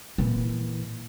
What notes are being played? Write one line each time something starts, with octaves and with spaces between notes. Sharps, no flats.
A#2 E3